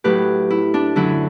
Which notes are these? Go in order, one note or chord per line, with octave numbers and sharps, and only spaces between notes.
A2 F#3 G4 B4
E4
D4
F#2 D3 F#3 E4